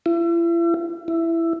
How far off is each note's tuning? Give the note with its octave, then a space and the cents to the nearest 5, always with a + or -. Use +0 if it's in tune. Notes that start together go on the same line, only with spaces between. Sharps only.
E4 +40
E4 +10